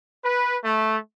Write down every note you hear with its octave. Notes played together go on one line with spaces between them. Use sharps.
B4
A3